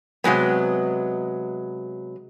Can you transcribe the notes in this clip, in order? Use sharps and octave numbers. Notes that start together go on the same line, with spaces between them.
C3 F#3 G#3 B3